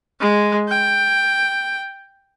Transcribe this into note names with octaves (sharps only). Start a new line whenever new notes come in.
G#3
G5